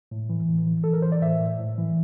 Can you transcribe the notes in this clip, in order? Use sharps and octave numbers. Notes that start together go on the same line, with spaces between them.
A2
E3
A2
E3
E3 A4
A#4
E3 C5
D5
A2 E5
A2
A2
E3